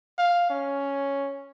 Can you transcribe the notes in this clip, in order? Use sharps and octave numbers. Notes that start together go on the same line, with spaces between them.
F5
C#4